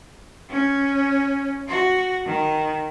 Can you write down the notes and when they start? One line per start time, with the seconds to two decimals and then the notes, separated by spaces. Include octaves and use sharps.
0.50 C#4
1.68 F#4
2.26 D#3